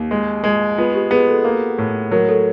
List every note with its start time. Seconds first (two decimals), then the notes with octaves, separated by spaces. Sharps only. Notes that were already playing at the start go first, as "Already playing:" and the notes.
Already playing: D#2 G4
0.11 G#3
0.44 G#3
0.78 B3 F4
0.94 G4
1.11 B3 G#4
1.29 A4
1.44 A#3
1.78 A2
2.11 F#3 A#4
2.29 A4